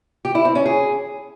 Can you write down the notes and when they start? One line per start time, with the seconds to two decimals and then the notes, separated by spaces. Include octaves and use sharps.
0.25 G4
0.35 E4
0.45 C4
0.55 C#4
0.66 G#4